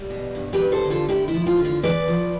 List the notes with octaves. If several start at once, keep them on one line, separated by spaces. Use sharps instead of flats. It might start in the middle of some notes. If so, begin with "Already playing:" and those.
Already playing: G3
B2
G2
G4 B4
G3
A4 C5
D3
F4 A4
D2 E4 G4
E4
F3
F4
D3
F4
E2 B4 D5
F3